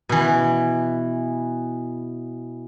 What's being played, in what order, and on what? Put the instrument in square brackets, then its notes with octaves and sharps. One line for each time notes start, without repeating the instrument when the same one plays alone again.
[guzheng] B2 E3